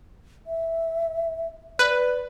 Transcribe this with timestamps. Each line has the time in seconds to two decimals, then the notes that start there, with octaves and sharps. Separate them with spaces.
0.47 E5
1.79 B4 D5